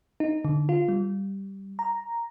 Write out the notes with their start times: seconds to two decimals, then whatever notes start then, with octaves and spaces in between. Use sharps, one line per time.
0.20 D#4
0.45 D3
0.69 F4
0.88 G3
1.79 A#5